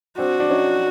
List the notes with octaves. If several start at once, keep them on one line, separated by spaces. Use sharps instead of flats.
C4 D4 F#4
D4
C#4 D#4